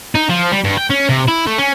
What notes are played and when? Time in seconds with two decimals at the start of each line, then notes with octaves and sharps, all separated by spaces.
0.15 D#4
0.29 F3
0.52 G3
0.64 G2
0.77 G5
0.90 C#4
1.09 C3
1.28 E4
1.47 A3
1.58 C#4